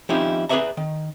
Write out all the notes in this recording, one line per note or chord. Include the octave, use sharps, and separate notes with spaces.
F3 C4 C#4 D#4 E4 G4
G#4 B4 C#5 D5 E5 A#5
D#3